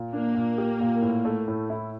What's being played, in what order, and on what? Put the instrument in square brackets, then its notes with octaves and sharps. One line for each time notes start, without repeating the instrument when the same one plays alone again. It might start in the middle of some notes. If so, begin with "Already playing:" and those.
Already playing: [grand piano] A#2
[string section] A#3 [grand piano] D4
[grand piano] A#2
G4
A#2
A2
A3
A2
E4